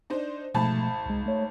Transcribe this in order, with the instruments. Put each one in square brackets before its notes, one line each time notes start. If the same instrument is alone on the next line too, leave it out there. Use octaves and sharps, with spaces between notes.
[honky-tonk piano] D4 D#4 C5
[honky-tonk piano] G#1 A5 B5 [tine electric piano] B2 F3 A3
[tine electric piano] C2 G#3
A3 C#5